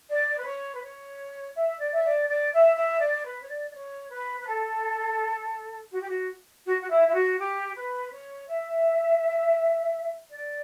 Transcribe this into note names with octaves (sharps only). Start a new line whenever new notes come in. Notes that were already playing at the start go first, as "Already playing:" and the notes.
D5
B4
C#5
B4
C#5
E5
D5
E5
D5
D5
E5
E5
D5
B4
C#5
D5
D5
C#5
B4
B4
A4
F#4
G4
F#4
F#4
F#4
E4
E4
F#4
G4
B4
C#5
E5
D5